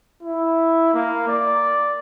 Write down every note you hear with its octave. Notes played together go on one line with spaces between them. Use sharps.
E4
A#3
D5